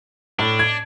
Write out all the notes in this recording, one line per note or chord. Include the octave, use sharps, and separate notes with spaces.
A2 D4
G#6